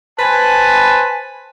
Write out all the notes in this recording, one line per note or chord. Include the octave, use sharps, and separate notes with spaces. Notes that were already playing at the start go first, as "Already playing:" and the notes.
B4 C5 G#5 A5